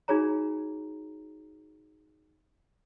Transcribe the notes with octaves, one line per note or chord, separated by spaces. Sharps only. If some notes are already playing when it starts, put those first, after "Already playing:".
D#4 F#4 G#4 C#5 A#5